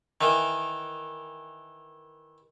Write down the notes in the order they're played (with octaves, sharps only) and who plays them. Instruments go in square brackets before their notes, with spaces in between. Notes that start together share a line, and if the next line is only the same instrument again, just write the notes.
[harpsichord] D#3 E3